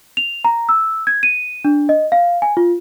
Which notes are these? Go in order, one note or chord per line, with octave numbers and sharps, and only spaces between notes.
F7
A#5
E6
G#6
D#7
D4
D#5
F5
G#5
F4